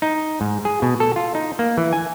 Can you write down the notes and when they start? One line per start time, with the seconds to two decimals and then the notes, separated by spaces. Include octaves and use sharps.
0.02 D#4
0.41 G#2
0.65 G#4
0.82 B2
1.00 A4
1.16 F4
1.35 D#4
1.59 A#3
1.77 E3
1.93 G#5